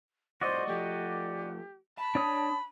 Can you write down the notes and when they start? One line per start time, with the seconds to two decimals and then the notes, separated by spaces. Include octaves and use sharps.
0.41 C2 A2 F#4 C5 D5 D#5
0.67 F3 A3 G4
1.98 A5 B5
2.15 D4 C#5 D#6